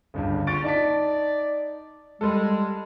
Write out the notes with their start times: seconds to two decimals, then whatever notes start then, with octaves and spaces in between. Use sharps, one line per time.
0.14 G1 C#2 G2
0.47 A#3 C#4 F4 C#6 A6 D7
0.64 D#4 D5 A5 B6
2.21 G3 G#3 A4